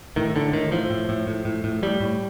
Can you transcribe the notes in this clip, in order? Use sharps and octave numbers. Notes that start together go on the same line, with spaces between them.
A2 D#3
A2 D3
A2 D#3
A2 F3
A2
A2
A2
A2
A2
A2 G3
A2